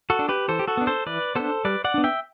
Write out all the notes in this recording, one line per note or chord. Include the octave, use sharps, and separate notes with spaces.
F#4 A4
D4
G4 B4
E3 A4 C5
G4
F#4 A4
B3 D4
A4 C5
E3 B4 D5
B3 D4 A4 C5
G3 B4 D5
D5 F#5
B3 D4
E5 G5